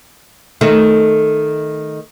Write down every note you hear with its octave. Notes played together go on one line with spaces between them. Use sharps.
D#3 A3